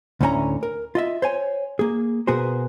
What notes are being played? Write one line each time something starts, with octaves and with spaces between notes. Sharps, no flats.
D2 A2 D3 C#4 G#5 A#5
A#4
F4 D#5 E5
C5 C#5 G#5
A#3 G#4
B2 B3 F#4 G#4 A#4 C5